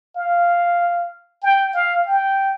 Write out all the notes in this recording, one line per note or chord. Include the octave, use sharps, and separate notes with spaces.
F5
G5
F5
G5